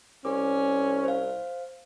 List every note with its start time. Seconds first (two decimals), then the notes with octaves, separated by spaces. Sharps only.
0.25 C2 C#4 D6
1.04 C5 F5